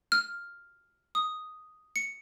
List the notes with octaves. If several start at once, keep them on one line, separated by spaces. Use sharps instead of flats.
F6
D#6
C#7